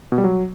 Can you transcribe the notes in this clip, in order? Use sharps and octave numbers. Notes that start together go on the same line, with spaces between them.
B2
G3
F#3